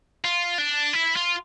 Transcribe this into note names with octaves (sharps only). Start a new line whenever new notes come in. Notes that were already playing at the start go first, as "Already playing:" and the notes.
F4
D4
E4
F4